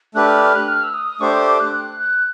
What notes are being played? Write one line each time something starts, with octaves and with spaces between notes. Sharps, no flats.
A3 D4 G4 B4 F#6
F6
F#6
F6
F#6
F6
E6
D#6
A3 D4 G4 C5 C#6
D6
D6
F#6
F#6
F#6